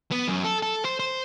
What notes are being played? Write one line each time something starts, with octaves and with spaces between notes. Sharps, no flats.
B3
F#2
A4
A4
C5
C5